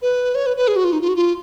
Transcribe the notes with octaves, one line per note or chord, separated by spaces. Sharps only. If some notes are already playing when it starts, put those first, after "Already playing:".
B4
C#5
B4
B4
G#4
F#4
F4
D#4
F4
F#4
F4